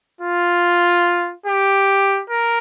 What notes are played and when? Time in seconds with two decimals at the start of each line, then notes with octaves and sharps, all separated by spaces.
0.21 F4
1.46 G4
2.30 A#4